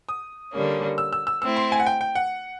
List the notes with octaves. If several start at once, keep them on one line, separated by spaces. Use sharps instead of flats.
D#6
D3 G3 A#3 C#4
E6
E6
E6
A3 C4 E4 E6
C6
G#5
F#5
G5
G5
F#5